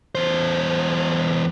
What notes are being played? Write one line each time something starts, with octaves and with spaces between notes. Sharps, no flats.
E2 C5